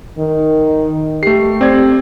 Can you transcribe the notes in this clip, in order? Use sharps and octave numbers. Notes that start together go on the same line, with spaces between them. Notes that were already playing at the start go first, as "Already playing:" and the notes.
D#3
A3 G4 C7
C4 D5 G#6